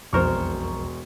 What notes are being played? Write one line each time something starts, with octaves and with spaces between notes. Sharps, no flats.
E1 B1 F2 A#4 C5 C#6